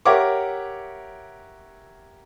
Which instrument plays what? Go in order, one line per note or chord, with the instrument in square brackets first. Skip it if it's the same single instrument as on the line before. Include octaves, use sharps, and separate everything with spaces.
[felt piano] G4 A#4 C#5 E5 F#5 D6